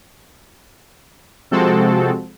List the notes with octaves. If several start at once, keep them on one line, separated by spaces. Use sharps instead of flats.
C3 F3 G#3 C4 F#4 A4